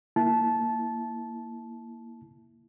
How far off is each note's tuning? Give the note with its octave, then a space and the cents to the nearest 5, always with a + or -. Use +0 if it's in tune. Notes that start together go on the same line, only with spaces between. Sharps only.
A#3 +0 E4 +0 A5 -15